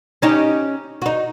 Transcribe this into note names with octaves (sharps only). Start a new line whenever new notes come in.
C#4 D#4 G4
D#4 F#4